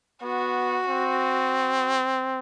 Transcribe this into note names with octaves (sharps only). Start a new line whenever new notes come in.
B3 F#4
C4